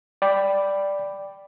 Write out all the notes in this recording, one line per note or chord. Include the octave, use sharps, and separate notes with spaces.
D5 G5 B5